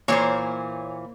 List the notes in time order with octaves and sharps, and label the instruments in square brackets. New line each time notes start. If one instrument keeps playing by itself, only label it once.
[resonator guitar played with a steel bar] A#2 E3 C5 [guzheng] A#3 [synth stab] C#5